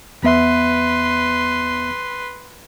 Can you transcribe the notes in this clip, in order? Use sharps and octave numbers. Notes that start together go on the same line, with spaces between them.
E2 B3 B4 E5 C6